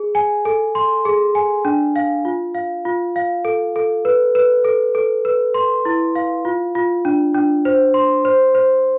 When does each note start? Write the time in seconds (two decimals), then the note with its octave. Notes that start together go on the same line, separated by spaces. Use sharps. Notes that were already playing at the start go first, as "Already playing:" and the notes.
Already playing: G#4
0.15 G#5
0.45 A4
0.75 C6
1.05 G#4
1.35 G#5
1.65 D4
1.96 F5
2.25 F4
2.55 F5
2.85 F4
3.16 F5
3.45 A4
3.76 A4
4.05 B4
4.35 B4
4.64 A4
4.95 A4
5.25 B4
5.54 C6
5.85 E4
6.15 F5
6.45 F4
6.75 F4
7.05 D4
7.34 D4
7.65 C5
7.94 C6
8.25 C5
8.55 C5